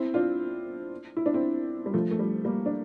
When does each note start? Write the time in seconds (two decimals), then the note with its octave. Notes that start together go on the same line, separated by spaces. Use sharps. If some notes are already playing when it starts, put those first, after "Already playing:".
Already playing: C4 E4
0.14 D4 F4
1.17 E4
1.26 D4
1.34 C4 E4
1.86 G3
1.94 F3 A3
2.11 A3
2.19 G3
2.45 G3 A#3
2.66 D4